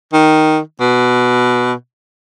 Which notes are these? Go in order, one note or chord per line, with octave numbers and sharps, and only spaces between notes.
D#3
B2